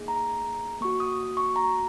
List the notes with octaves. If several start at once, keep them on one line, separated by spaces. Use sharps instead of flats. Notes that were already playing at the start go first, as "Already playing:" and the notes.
Already playing: A#3 D#4 G#4
A#5
A#3 F#4 C#6
D#6
C#6
A#5